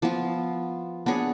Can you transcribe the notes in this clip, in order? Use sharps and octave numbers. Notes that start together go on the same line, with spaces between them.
F3 B3 F4
B3 D4 G#4 C#5